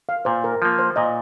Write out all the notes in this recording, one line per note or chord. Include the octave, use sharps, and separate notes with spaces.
F5
A#2 C5
A#4
F3 A#3
C5
A#2 D#5